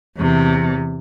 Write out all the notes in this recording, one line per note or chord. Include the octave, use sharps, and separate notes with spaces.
E2 C3